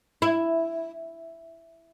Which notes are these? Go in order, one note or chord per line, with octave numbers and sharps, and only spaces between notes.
E4